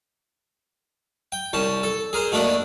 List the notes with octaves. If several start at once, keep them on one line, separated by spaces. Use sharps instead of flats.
G5
C2 C#4 A5
A4
G#4 A#4 C5
B2 A3 A#3 D4